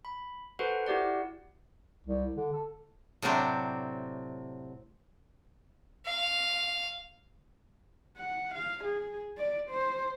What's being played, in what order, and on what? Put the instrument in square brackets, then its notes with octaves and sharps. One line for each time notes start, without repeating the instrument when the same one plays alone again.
[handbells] B5
F#4 A4 B4 C5 F#5
E4 F#4 G4 D5 F#5
[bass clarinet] C2
D3
A4
[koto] A2 C3 F#3 C4 D4
[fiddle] F5
[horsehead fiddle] F#5
F5
G#4
D5
C5